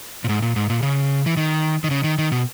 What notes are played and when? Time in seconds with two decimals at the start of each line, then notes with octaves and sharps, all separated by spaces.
0.24 A#2
0.29 G#2
0.42 A#2
0.56 G#2
0.70 A#2
0.82 C#3
1.26 E3
1.37 D#3
1.84 D#3
1.91 C#3
2.04 D#3
2.18 D#3
2.32 B2